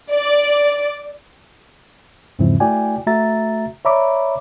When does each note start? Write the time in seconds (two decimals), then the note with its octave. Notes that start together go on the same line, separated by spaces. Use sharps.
0.11 D5
2.39 E2 G#2 C#3 F3 C4 E4
2.60 A3 E4 F#4 D5 G5 G#5
3.07 A3 F#4 E5 A#5 A6
3.85 C#5 D5 E5 A#5 B5 D6